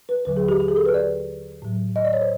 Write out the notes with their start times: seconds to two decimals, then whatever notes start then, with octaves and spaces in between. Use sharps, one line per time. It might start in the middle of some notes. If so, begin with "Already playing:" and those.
0.09 B4
0.25 D#2 D3 F#3 B4
0.37 G#4
0.49 G4
0.60 G4
0.68 G#4
0.76 A4
0.86 B4
0.94 D5
1.62 A2 F#3
1.96 D#5
2.05 D5
2.13 C#5
2.22 C5